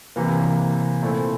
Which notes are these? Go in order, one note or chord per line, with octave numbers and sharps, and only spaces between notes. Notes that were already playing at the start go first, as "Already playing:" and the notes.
C3 E3 A#3
A#2 A3 C4 E4